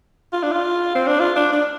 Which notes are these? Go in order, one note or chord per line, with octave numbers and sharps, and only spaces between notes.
F4
D4
F4
C4
D4
F4
D4
D4